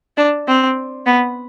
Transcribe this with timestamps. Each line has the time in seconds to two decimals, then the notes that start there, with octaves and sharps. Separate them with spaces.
0.17 D4
0.48 C4
1.06 B3